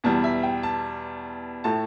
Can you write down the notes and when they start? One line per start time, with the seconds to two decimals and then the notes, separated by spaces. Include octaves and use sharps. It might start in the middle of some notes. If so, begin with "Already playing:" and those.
0.04 E2 B2 G3 A5
0.24 E5
0.43 G5
0.63 A5
1.64 A2 A3 A5